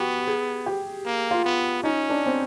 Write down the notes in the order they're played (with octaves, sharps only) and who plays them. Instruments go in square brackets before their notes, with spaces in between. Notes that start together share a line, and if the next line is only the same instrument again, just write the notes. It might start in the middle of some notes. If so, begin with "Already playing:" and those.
Already playing: [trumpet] B3 [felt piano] F#4 G4
[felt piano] G#4
G4
[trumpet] A#3
[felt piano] F4
[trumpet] B3
[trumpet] C#4 [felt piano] D#4
[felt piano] D4
C4